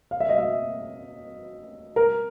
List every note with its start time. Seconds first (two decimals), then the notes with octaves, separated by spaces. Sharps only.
0.11 F5
0.20 E5
0.29 D#5
0.38 E5
1.96 A#4